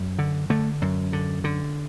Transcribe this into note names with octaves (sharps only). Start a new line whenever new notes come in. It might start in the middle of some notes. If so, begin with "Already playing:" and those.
Already playing: F#2
D3
D3 A3
F#2
D3
D3